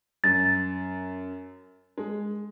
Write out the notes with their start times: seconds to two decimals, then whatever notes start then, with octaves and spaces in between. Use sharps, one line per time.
0.24 F#2 A6
1.98 G#3